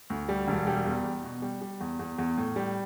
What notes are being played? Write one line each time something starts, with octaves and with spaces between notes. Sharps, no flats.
D2
G3
E1
G3
E2
E2
B2
G3
G3
E2
E2
E2
A2
G3